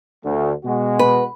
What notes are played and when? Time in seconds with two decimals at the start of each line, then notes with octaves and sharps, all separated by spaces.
0.25 D2
0.65 B2 G#3 F#4
0.99 B4